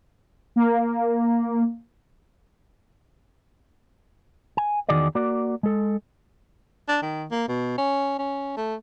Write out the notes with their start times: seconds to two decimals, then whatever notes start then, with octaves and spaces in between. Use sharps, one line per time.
0.56 A#3
4.57 G#5
4.88 E2 D#3 F#4 G#4 D5 D#5
5.15 A#3 F#4 D5
5.63 G#3 A4
6.89 D4
7.02 D#3
7.31 A#3
7.49 B2
7.78 C#4
8.19 C#4
8.57 A3